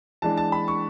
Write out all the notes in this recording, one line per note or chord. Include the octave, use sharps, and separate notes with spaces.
E3 G#3 D4 A5
A5
B5
C#6